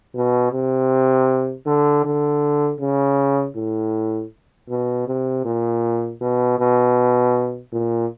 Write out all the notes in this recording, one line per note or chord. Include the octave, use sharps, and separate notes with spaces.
B2
C3
D3
D3
C#3
A2
B2
C3
A#2
B2
B2
A#2